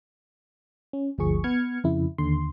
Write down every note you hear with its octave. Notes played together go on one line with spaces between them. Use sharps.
C#4
G1 D2 F3 G#4 C#6
B3 B4 F6 G#6 C#7
F2 C#3 E4
D#2 D3 C6